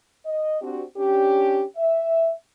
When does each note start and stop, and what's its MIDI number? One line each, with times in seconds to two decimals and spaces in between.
0.25 0.59 75
0.61 0.83 60
0.61 0.83 62
0.61 0.83 66
0.61 0.83 67
0.97 1.64 61
0.97 1.64 62
0.97 1.64 67
1.77 2.31 76